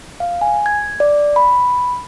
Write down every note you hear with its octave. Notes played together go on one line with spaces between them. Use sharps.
F5
G#5
G#6
D5
B5